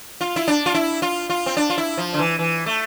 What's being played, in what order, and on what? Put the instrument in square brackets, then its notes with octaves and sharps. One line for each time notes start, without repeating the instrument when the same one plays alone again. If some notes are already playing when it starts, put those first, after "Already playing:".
[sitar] F4
E4
D4
F4
E4
F4
F4
C4
D4
F4
E4
F3
D3
E3
E3
A3